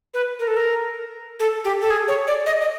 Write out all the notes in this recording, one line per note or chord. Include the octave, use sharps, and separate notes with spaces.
B4
A#4
A4
A#4
A4
G4
A4
G#4
C#5
D5
D#5
D#5